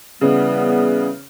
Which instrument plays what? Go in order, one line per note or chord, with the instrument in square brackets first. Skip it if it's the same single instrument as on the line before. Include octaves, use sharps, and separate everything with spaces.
[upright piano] C#3 [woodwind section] E3 G3 B3